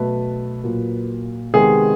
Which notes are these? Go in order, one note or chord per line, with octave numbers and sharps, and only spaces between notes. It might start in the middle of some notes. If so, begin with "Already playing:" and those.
Already playing: B2 F#3 A3 B4
A#2 F#3 A#3
C3 D#3 G#3 B3 G#4